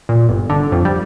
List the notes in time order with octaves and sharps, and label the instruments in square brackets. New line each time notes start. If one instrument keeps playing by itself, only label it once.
[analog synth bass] A#2
G1
D3
F2
G3